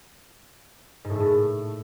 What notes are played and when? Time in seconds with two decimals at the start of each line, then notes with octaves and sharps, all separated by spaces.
1.05 G#2
1.10 A2
1.15 A3
1.20 A2